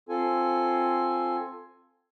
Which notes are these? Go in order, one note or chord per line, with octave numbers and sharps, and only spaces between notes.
C4 F4 A4 G#5